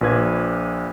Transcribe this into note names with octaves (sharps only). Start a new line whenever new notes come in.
A#1 A#2 B4 G#6